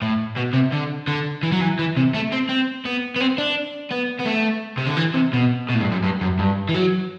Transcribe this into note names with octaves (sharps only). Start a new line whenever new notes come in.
A2
B2
C3
D3
D3
E3
F#3
E3
E3
C3
A3
C4
C4
B3
B3
C4
D4
B3
B3
A3
C3
D3
E3
C3
B2
B2
A2
G2
F#2
G2
F#2
G2
E3
F#3